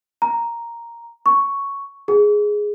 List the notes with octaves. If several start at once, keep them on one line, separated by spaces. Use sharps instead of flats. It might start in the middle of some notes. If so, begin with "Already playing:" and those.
A#5
C#6
G#4